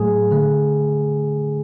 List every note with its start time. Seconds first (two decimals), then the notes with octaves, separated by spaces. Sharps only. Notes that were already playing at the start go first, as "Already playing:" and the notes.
Already playing: A2 F#3 A3 G#4
0.31 D3 A3